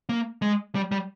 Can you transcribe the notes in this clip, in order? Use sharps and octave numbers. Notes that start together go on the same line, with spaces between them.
A#3
G#3
G3
G3